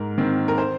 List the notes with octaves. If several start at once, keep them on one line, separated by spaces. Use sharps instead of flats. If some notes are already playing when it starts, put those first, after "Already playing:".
Already playing: G#2 A#4
D#3 C4
A#4
C5